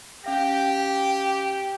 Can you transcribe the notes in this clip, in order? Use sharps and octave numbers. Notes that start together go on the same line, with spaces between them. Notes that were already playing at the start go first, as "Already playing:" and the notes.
C#4 G4 F5 G5 A#6